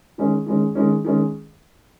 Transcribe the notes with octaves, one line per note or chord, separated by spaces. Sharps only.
D#3 G#3 C#4
D#3 G#3 C#4
D#3 G#3 C#4
D#3 G#3 C#4